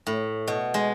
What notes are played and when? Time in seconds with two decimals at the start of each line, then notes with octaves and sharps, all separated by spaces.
0.07 A2
0.48 B2
0.74 G#3